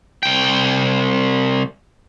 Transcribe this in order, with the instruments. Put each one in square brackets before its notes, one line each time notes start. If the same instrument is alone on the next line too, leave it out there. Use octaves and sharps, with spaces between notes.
[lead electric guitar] C2 G5